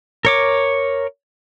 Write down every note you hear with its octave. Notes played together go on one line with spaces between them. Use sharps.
A#4 C#5 D6